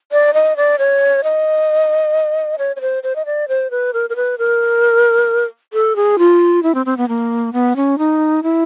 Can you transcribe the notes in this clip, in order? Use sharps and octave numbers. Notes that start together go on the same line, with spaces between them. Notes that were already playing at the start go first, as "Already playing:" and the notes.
D5
D#5
D5
C#5
D#5
C#5
C#5
C5
C5
D#5
D5
C5
B4
A#4
A#4
B4
A#4
A4
G#4
F4
E4
C4
C4
B3
A#3
B3
C#4
D#4
E4